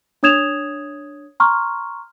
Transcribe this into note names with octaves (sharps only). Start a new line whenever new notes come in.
D4 C#5 D#6 G#6 E7 F7
A#5 C6 C#6 F6